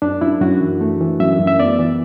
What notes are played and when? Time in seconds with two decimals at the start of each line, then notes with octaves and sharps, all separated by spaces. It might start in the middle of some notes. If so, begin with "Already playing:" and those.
0.02 F#2 D4
0.21 F#2 E4
0.41 F#2 F#4
0.61 E3
0.81 A3
1.01 E3
1.20 F#2 E5
1.40 F#2
1.47 E5
1.60 B3 D5
1.79 E3